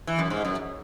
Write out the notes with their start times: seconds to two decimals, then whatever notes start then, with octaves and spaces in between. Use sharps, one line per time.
0.07 E3
0.19 F#2
0.30 G#2
0.45 F#2